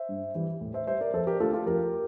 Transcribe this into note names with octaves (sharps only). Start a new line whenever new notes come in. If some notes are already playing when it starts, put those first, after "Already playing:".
Already playing: C5 E5
G2
E3 G3
A2
C5 E5
G3 C5 E5
A#4 D5
F2 A4 C5
G4 A#4
D3 A3 F4 A4
F4 A4
F2 G4 A#4